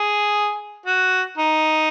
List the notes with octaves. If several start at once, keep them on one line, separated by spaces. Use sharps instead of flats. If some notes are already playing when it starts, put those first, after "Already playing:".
Already playing: G#4
F#4
D#4